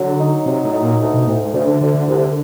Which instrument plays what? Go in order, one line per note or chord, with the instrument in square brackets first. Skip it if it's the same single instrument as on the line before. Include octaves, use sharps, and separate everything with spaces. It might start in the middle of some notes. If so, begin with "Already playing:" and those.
Already playing: [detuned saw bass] D3 [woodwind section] F#3
[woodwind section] D#4
[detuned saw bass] C3 [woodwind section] F#3
[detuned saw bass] A2
[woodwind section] D#4
[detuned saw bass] A#2
[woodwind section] D2
[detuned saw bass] B2
[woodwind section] D2 [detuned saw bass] A2
[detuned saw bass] G#2
[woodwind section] D2 [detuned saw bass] C#3
[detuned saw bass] D3
[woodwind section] D2 [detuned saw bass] D3
[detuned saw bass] D3
[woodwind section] C2 [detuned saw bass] D3